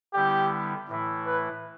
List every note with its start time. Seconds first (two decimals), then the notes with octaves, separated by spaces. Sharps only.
0.14 D3 G3 B3 E4 G4
0.89 A2 E3 A3 E4
1.26 B4